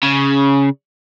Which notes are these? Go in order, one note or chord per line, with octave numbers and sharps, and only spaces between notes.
C#3